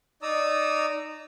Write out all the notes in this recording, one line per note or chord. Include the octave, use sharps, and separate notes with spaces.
D#4 D5 A#5 D#6 E6